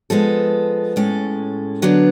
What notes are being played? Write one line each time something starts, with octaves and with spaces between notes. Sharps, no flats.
F3 G#3 B3 A4
A2 G#3 C#4 A4
D3 F#3 B3 D4